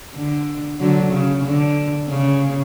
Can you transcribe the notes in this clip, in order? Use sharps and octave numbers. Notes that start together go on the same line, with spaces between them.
D3
D3 F#3
C#3
D3
C#3